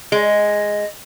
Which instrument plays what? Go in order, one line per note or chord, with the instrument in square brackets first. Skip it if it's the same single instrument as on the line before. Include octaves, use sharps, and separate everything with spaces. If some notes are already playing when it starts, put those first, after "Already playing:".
[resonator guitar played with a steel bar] G#3 [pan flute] D#5